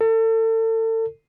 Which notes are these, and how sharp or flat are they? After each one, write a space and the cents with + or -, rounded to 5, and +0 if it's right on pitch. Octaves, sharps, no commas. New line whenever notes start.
A4 +35